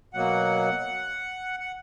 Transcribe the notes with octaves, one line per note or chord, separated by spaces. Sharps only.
B2 F#3 A#3 F#5
F#5